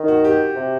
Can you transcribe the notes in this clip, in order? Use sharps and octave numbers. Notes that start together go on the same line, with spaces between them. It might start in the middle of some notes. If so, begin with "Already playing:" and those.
Already playing: D#3
F#4
G4
C3